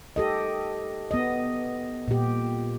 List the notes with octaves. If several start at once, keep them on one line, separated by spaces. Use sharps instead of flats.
G4 A4 D#5
B3 D#5
A#2 G4